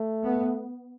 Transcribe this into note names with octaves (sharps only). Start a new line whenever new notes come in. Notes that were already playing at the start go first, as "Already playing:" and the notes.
Already playing: A3
B3